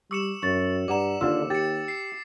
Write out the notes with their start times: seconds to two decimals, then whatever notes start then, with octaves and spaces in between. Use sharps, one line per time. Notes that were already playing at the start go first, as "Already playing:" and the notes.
0.11 G3 C#6 D6 E6 C#7 E7
0.42 F#2 C#6 A6
0.88 G2 D5 F#5 A#5 D6 E7
1.21 D#2 D3 F4 E6
1.50 G4 A6 C#7
1.88 C7